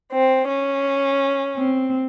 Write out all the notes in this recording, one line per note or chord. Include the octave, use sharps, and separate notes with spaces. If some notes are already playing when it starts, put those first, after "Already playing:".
C4
C#4
C4